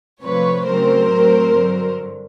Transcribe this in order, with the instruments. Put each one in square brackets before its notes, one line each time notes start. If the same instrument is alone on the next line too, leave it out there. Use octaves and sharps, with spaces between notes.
[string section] C3 F3 A3 B4 C#5
C#3 F#3 A3 C4 A#4 C5
A2 F#3 A3 C4
G2 D3 F#3